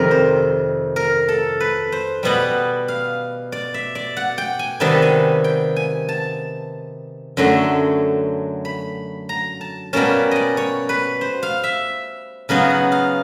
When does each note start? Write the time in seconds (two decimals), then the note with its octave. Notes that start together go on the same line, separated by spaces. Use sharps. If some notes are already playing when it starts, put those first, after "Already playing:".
Already playing: F2 C3 D#3 G3 A#4
0.11 C5
0.96 A#4
1.28 A4
1.60 B4
1.92 C5
2.23 B2 G3 B3 F#5
2.88 F5
3.52 D5
3.74 E5
3.95 D5
4.17 F#5
4.38 G5
4.59 G#5
4.80 C3 D#3 G3 B3 A5
5.02 G#5
5.44 G5
5.76 G#5
6.09 A5
7.37 F#2 D3 F#3 A3
8.65 B5
9.29 A#5
9.61 A5
9.93 B2 G3 A#3 C#4 A5
10.31 D5 D#5
10.57 C#5
10.89 B4
11.21 C5
11.43 F5
11.64 E5
12.49 C#3 F#3 B3 D#4 F5
12.70 F#5
12.92 F5